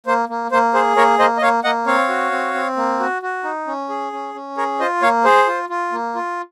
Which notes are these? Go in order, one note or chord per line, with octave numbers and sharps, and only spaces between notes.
A#3 C5
A#3
A#3 C5
G#4 C5
A#3 A#4 C#5
A#3 C5 D#5
D#5
A#3 C#5 F5
A#3 D#5 F#5
C4 C#5 F5
F#4
C4
C4
A#3
F#4
F#4
D#4
C#4
G#4
C#4
C#4
G#4 A#4 C#5
F4 C5 D#5
A#3 C#5 F5
G#4 C5
F4
F4
A#3
F4